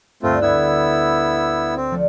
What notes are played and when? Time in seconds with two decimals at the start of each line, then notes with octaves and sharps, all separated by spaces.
0.23 D2 G2 A3 C4 F4
0.42 B3 E4 E6 F#6 G#6
1.76 C4
1.91 F3 A3 D5